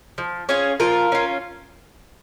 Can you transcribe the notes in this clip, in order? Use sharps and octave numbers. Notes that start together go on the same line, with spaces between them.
F3
C#4 F4 G#4 C#5
F3 F4 A#4
C#4 F4